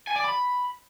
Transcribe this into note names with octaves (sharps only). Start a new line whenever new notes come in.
G#5
D5
B5